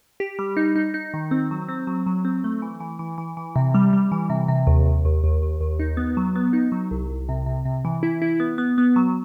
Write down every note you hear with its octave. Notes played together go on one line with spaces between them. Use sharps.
G4
G3
D#4
D#4
D#4
D#3
C4
F#3
C4
F#3
F#3
C4
A3
E3
E3
E3
E3
E3
C3
G3
G3
E3
C3
C3
D#2
D#2
D#2
D#2
D#2
D#2
D#4
B3
F#3
B3
D#4
F#3
C2
C2
C3
C3
C3
E3
E4
E4
B3
B3
B3
F#3